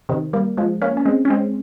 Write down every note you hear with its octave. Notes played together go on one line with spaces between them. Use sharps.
C3 D#3
G3 A#3
F3 G#3
A#3 C#4
C#4
G#3 C4
C#4
G#3 C4